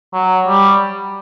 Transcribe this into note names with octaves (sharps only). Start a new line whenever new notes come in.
F#3
G3